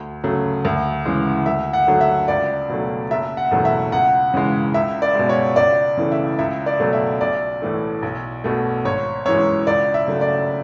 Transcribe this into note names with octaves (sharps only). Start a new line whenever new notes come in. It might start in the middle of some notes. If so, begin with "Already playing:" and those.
Already playing: D2
C#3 F#3 A3
D2
C#3 E3 G#3
D2 E5
F#5
D3 F#3 A3
E5
C#2 D5
B2 F#3 A3
F#1 E5
F#5
E2 B2 F#3 A3
E5
C#2 F#5
C#3 E3 G#3
C#2 E5
D5
B2 G#3
C#5
C#2 D5
C#3 E3 A3
E5
C#2 E5
D5
B2 F#3 A3
E5
B1 D5
A2 E3 A3
B1
B2 A3
G#1 C#5
F#2 E3 G#3 C#5
C#2 D5
E5
C#3 F#3 A3
D5